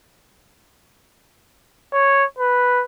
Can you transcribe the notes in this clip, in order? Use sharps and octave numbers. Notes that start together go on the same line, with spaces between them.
C#5
B4